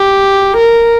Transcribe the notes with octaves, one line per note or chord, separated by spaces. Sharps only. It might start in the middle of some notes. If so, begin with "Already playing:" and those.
Already playing: G4
A#4